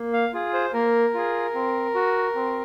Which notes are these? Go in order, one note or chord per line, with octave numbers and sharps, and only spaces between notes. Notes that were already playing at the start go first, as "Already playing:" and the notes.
Already playing: A#3
F5
F4 G#4
C5
A#3 A#4
F4 G#4
C4
F#4
C4